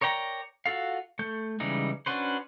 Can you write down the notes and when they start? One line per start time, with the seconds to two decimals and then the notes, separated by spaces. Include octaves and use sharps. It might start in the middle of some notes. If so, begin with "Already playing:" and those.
0.01 A#4 C#5 D5 G5 A#5
0.66 F4 F#4 A4 F5
1.19 A3 G6
1.60 C#3 E3 G3 G#3 D#4
2.06 C#4 D4 F#4 B4 C5